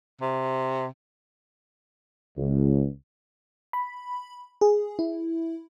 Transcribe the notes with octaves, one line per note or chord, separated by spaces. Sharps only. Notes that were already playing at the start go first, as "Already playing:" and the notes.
C3
C#2
B5
G#4
E4